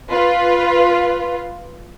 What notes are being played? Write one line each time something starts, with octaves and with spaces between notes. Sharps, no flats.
F4 B4